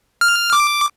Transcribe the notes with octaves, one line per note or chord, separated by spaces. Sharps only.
F6
D6